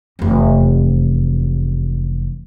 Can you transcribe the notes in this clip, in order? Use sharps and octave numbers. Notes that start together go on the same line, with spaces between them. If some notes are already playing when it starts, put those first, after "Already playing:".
F1 E2